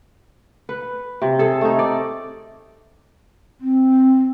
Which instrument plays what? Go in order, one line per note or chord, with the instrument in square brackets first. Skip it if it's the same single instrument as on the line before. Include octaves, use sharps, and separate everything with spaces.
[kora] B4
C3
G#4 A4
A3 D#4
D5
[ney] C4